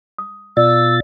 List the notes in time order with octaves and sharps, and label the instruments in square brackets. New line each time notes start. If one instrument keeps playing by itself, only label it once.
[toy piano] D#6
[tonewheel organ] B2 F4 A6 [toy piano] D5 [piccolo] E6